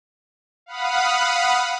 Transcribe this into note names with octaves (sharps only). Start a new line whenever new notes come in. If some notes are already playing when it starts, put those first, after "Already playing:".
F5 F#5 B5 D#6